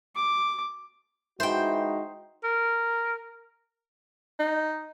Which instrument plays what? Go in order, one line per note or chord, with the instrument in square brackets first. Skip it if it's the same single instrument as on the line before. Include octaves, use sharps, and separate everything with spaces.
[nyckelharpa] D6
[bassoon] E3 [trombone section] G#3 D#4 F#4 [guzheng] C5 G5
[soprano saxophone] A#4
D#4